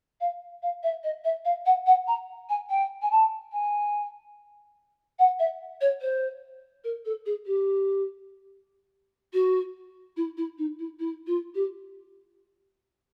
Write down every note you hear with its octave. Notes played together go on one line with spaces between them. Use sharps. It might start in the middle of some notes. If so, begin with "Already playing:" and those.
F5
F5
E5
D#5
E5
F5
F#5
F#5
A#5
G#5
G5
G#5
A5
G#5
F#5
E5
C#5
C5
A#4
A4
G#4
G4
F#4
E4
E4
D#4
E4
E4
F4
G4